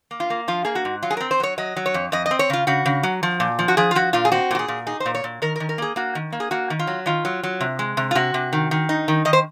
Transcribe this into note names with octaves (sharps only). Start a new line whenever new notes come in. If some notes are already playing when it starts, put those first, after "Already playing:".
A#3
F4
A#3
F3 F4
A#3 G#4
F#4
G#2
F#3 F4
G#4
C4 A#4
C5
F#3 C#5
F#3 D#5
F#3
C#5
F2
F2 D#5
D#5
C4
C#5
C#3 F4
C#3 F#4
C#3
F#3
F3
A#2
F3
F#4
F3 G#4
F4
F3 F#4
A#2 F4
G#4
C4 F#4
A#2 F#4
G#4
A#2
D#4 G#4
C5
A#2
C#5
A#2
D#3 A#4
A#4
D#3
A#4
A#3 G#4
A#3 F#4
D#3
A#3
G#4
A#3 F#4
D#3
F4
F#3
D#3 F4
F#3
F#3
C3
G#3
C3
F4
C3 F#4
C3
D#3
D#3
D#4
D#3
D#3 D#5
C5